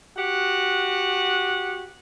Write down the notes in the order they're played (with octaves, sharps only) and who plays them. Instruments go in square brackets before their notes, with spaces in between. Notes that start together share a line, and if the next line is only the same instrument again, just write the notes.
[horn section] F#4 G4 F#5